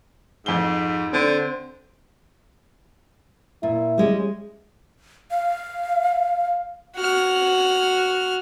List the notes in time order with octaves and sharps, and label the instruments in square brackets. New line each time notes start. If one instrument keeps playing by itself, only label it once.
[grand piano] F2 G7 [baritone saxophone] G#2
[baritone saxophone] D3 [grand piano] C4
[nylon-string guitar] A#2 [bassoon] E4
[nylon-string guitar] G3 G#3 C#4
[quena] F5
[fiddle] F#4 F6